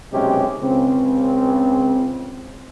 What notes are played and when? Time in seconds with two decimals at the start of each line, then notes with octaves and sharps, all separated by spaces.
0.12 B1 C3 G#3 C#4 G4
0.61 C#2 C#3 C4